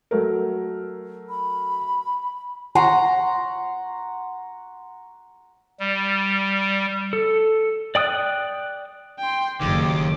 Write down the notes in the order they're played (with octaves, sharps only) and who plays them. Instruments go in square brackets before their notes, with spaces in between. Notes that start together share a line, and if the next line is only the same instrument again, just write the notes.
[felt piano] F#3 A3 A#4
[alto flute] B5
[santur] F#5 A#5 C6 C#6
[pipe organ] G3
[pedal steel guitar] A4
D5 G5 D#6 F6 F#6
[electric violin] G5 C6
[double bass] F#1 [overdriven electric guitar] D#2 [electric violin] D6